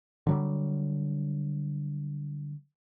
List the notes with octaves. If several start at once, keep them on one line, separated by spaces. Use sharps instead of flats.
D3 F#3 G3